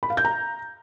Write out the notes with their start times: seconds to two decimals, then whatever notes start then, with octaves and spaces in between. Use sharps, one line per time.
0.03 B5
0.10 F5
0.17 G6
0.25 A#5